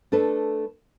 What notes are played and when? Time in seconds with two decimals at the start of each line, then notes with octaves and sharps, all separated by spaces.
0.12 A3 D4 A4 B4